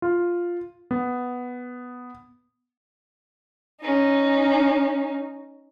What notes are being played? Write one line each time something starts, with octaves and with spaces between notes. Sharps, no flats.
F4
B3
C#4 D#4